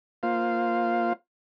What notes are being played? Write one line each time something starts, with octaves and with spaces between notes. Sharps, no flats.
A#3 F4 C5 F5